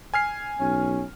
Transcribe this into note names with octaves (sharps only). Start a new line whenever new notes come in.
G#5 F6 C7
B1 C#4